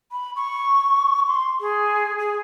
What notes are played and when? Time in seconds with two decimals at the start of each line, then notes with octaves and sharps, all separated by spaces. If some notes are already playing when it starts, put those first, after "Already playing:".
0.12 B5
0.36 C#6
1.27 C6
1.60 G#4
2.19 G#4